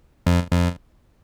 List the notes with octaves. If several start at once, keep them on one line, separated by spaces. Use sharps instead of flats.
F2
F2